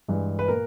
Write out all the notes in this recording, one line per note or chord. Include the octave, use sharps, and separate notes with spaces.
G2 E3 G#3
B4
A#2 A#3 A#4